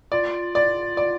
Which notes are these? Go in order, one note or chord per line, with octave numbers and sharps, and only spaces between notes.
F4 D5
D5
D5